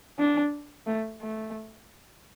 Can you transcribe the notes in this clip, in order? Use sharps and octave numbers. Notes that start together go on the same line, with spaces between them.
D4
A3
A3